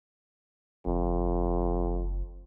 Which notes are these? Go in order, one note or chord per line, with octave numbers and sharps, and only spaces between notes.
F#1 F2